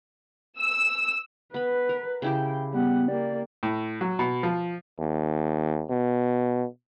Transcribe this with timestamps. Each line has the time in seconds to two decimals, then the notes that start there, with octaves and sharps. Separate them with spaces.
0.58 E6
1.54 B3 B4 B5
1.89 A#4
2.22 C#3 E4 G4 G5
2.74 G3 B3 F#5
3.08 A#3 G4 D5
3.63 A2
4.01 F#3
4.19 B2
4.43 F3
4.99 D#2
5.89 B2